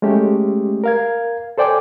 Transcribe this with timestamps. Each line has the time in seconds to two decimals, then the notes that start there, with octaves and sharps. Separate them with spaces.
0.02 G#3 A3 C#4 G4
0.84 A#4 F5 G#6
1.58 A4 C5 D5 G5 G#5 D6